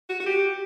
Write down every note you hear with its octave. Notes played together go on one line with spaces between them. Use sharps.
F#4
F#4
G4